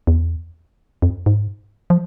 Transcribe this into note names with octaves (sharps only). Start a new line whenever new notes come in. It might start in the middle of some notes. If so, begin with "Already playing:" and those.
E2
F2
G#2
F3